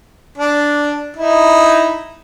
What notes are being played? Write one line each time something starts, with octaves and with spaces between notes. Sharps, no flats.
D4
D#4 E4